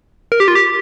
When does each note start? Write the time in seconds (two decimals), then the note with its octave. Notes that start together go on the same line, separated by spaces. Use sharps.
0.32 A#4
0.40 G4
0.48 F4
0.55 G4